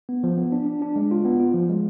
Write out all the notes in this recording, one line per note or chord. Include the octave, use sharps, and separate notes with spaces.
B3
F3
B3
D4
D4
D4
G#3
F4
B3
F4
F3
G#3